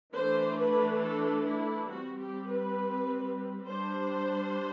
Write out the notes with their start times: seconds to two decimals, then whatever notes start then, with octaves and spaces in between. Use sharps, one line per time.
0.13 E3 A3 D4 C5
0.58 B4
1.02 A4
1.46 E4
1.90 G3 C4 F#4
2.19 G4
2.48 B4
3.66 G3 D4 C5